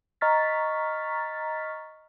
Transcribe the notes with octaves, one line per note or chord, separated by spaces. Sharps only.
D#5 A#5 C#6 F6 A6 B6